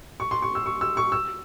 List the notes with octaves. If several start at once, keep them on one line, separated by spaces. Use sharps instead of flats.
C#6
C6
C#6
E6
C#6
E6
C#6
E6